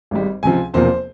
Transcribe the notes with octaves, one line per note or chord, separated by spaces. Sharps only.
G#1 G#2 G3
C#2 C3 F3 G#5
E1 E2 C3 F3 A#3 C5